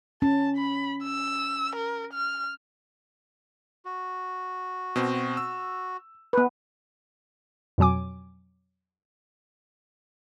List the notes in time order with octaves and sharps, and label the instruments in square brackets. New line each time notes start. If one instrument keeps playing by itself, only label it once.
[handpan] C#4 [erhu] A5
[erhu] B5
E6
A#4
F6
[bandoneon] F#4
[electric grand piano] B2 C4
E6
[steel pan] B3 B4
[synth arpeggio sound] F2 B2 F#3 G#5 D6